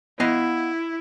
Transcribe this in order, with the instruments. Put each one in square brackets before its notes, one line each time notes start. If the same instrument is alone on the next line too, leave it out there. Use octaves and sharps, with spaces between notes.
[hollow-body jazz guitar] B3 D#5 F5 [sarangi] E4